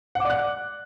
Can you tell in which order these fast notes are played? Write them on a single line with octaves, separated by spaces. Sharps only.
F#5 D6 D5 F#6